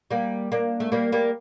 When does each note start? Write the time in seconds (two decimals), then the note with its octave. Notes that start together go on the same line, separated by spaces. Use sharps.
0.11 G3 A#3
0.52 A#3 D4
0.80 A3
0.92 G3 A#3
1.12 G3 A#3